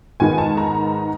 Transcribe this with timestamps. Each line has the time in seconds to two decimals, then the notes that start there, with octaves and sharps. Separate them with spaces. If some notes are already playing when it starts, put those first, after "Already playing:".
0.20 G#2 D#3 G#3 B3 D#4 G#5
0.38 A5
0.57 A#5